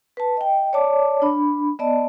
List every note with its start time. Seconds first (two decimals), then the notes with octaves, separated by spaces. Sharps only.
0.17 B4 A5
0.37 D#5 G5
0.73 C#5 D5 A5 D6
1.22 D4 B5
1.79 B3 D5 D#5 A5